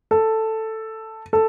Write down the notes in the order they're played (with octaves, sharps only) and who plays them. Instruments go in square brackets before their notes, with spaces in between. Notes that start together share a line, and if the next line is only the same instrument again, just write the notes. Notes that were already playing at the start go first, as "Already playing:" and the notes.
[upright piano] A4
A4